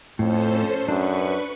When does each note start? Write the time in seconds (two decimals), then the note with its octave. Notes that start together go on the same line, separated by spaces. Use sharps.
0.19 F2 A2 C#4 A4 C5
0.88 F#2 D4 B4 C#6